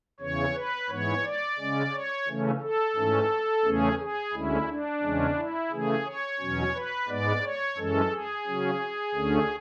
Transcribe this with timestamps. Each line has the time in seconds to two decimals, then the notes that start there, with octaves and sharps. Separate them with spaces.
0.20 E2 C#3 E3 C#5
0.54 B4
0.89 G#2 E3 B3 C#5
1.24 D5
1.58 C#3 G#3 C#4
1.93 C#5
2.27 C#3 E3 A3 C#4
2.61 A4
2.96 G#2 E3 A3 C#4
3.65 E2 C#3 E3 A3 C#4 G#4
3.99 G#4
4.33 D2 D3 G#3 C#4 E4
4.68 D4
5.02 E2 C#3 G#3 C#4
5.36 E4
5.71 C#3 E3 A3 G#4
6.05 C#5
6.40 E2 B2 F#3 C#4
6.74 B4
7.08 G#2 G#3 B3 D5
7.43 C#5
7.77 F#2 E3 G#3 C#4 A4
8.11 G#4
8.47 C#3 F#3 C#4
9.14 D2 D3 A3 C#4